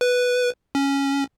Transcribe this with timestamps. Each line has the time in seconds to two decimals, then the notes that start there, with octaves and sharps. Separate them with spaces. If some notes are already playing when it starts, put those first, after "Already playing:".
0.01 B4
0.75 C#4